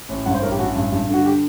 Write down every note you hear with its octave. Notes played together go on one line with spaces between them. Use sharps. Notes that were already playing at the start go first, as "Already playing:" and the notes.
A1
G2 F#5
C5
A1 A#4
G4
A1 F#4
G2
G2
D3 F#4
G4